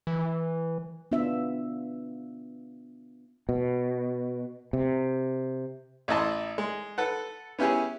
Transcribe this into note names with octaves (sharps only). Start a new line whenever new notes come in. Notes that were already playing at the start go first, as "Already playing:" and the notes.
E3
B3 D4 F4 E5
B2
C3
A1 E4 D#5 A5 C6
G#3
A4 B4 F#5
B3 C#4 E4 G4 G#4